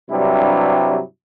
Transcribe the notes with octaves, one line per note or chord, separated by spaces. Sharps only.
G2 C3 F#3 G3 D4 E4